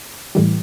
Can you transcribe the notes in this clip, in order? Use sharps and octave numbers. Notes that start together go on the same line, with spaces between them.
A2 E3 G3